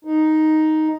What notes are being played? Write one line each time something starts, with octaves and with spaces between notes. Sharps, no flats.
D#4